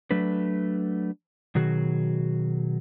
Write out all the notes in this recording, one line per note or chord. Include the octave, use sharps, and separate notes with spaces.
F#3 A3 D4 B4
B2 D#3 F#3 F#4 G#4